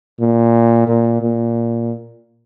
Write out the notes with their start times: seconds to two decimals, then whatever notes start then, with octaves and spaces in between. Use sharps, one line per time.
0.20 A#2
0.88 A#2
1.22 A#2